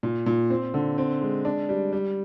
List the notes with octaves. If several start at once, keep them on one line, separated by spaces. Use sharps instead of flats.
A#2
A#2
C4
D3
C4
G#3
D4
G3
G3